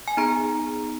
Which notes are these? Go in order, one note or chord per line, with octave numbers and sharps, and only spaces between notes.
G#5
B3 D#4 G#4 A#5